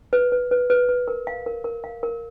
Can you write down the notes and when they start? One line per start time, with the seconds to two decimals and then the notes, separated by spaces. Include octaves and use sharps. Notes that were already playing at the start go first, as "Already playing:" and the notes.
0.13 B4
0.32 B4
0.51 B4
0.70 B4
0.89 B4
1.08 A#4
1.27 F5
1.46 A#4
1.64 A#4
1.84 F5
2.03 A#4